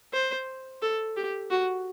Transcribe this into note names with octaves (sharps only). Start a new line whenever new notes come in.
C5
A4
G4
F#4